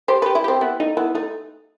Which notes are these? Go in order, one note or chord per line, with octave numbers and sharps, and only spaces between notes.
G4 C5
G4 B4
E4
C4 G4
B3 E4
A3 D#4
B3 E4
A3 D#4